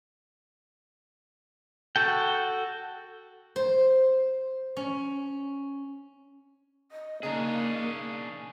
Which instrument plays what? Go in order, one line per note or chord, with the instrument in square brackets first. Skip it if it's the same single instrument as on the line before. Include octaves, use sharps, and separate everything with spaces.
[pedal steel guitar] F#4 A4 G5
[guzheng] C5
C#4
[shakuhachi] D#5
[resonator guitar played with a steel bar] C#3 D#4 [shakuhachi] A#3 [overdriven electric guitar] D4 G#4